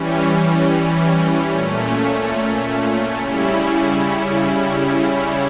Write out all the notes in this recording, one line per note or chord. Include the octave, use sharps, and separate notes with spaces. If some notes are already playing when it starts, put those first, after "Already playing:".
Already playing: E3 G3 C#4
A#2 A3 C#4
C#3 G3 C#4 E4